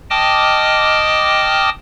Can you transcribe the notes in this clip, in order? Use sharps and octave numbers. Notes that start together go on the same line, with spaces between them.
D#5 G5 A5 D6 D#6 F6